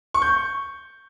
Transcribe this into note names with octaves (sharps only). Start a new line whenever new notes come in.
C#6
G6
C#6